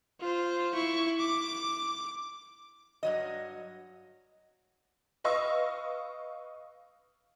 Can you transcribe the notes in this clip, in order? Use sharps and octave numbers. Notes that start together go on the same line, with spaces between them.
F4 C5
E4 C#6
D6
G2 F#3 D#5
B4 D#5 F5 C#6 E6